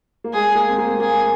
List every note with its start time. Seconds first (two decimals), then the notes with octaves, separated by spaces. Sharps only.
0.24 A#3
0.33 G#3 G#4
0.55 A#3
0.69 C4
0.78 A#3
1.00 A#3 G#4